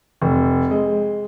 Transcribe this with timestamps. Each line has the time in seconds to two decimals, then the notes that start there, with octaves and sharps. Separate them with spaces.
0.22 F1
0.71 G#3